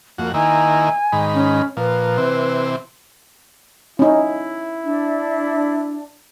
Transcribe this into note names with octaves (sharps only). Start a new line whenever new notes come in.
F2 A#3 F#4
D#3 A#3 E4 G#5
G#2 D#3 B5
C#4
A#2 F3 B4
C3 E3 C4
C#4 D#4 E4
D4